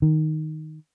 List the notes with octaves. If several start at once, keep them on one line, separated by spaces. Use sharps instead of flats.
D#3